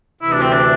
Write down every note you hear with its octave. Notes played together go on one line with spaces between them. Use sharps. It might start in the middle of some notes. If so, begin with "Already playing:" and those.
D2 C3 E3 E4
D4
C4
D4